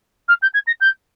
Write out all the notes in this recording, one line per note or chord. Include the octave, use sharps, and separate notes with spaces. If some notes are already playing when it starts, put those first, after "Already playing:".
F6
G6
G#6
A#6
G6